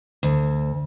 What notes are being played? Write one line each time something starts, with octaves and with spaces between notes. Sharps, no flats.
D2